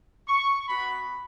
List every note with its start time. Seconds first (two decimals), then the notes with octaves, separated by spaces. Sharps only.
0.28 C#6
0.68 B3 F#4 B5